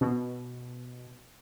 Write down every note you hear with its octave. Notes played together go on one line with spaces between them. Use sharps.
B2